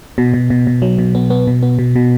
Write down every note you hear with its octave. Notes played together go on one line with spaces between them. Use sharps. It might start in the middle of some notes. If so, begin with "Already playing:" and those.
B2
B2
B2
B2
F#3
B2
B3
B3
B2
B3
B2
B2